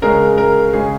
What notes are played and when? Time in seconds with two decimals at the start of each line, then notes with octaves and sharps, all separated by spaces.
0.02 C#3 G#3 A#4
0.38 A#4
0.73 C#3 G#3 G#4